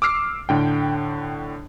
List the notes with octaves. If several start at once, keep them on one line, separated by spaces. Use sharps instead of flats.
D6 E6 F6 C7
A2 D3 G5